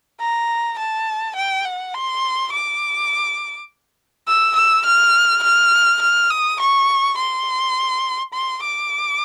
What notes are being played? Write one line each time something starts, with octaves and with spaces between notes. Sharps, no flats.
A#5
A5
G5
F#5
C6
D6
E6
E6
F6
F6
F6
D#6
C#6
C6
C6
D6